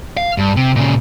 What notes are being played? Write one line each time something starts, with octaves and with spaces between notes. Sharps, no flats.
F5
G2
C3
A#2 C#3